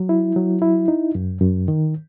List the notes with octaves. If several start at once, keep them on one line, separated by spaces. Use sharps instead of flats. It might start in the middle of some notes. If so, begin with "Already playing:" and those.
Already playing: F#3
E4
F#3
E4
D#4
F#2
F#2
D#3